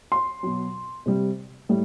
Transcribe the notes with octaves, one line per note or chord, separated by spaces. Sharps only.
C6
B2 F#3
C3 G3
A2 G3